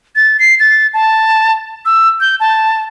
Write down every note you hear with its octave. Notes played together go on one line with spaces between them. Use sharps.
A6
C7
A6
A5
E6
G6
A5